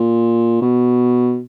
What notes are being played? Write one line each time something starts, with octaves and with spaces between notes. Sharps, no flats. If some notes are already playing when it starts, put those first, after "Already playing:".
Already playing: A#2
B2